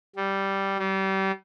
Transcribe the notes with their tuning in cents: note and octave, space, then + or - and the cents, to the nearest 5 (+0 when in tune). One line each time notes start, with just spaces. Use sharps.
G3 -5
G3 -30